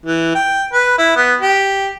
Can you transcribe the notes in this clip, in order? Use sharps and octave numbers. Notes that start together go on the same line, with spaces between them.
E3
G5
B4
E4
B3
G4